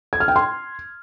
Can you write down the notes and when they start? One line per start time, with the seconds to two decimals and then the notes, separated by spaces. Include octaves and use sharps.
0.13 G#6
0.20 F6
0.28 G5
0.36 C6